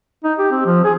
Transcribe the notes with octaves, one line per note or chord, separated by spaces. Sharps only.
D#4
G4
C4
F3
G#4